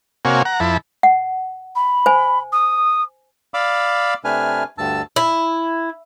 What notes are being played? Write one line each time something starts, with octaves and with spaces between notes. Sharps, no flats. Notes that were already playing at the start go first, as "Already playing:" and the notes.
C3 A#3 F#4 C#5 F5 G#5
F#5 A#5
F2 E4 A5 B5
F#5
B5
C5 G#5
D#6
D5 F5 B5 D6 E6
C3 A3 D4 B4 G#5 F6
D2 G2 A5 E6
E4